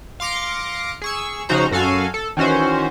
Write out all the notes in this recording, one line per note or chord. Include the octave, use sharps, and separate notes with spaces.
F5 C6 D6 A#6 C#7
G#4 C#6 E6
C#3 F3 D#4 F#4 C5 A#5
F#2 F#4 A4 F5 G#5
A4
D#3 E3 C#4 F#4 C5